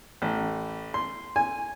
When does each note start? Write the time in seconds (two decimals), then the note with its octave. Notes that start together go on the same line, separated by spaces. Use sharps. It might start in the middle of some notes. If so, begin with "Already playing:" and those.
0.22 A1
0.94 C6
1.36 G#5